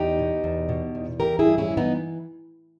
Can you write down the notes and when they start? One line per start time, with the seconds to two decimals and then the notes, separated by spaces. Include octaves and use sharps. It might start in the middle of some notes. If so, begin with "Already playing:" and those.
Already playing: E2 D#4 G4
0.19 B2
0.44 E2
0.69 B2
0.95 E2
1.20 E3 G4 A#4
1.39 E4 G#4
1.45 G2
1.58 C#4 E4
1.71 E3
1.77 B3 D#4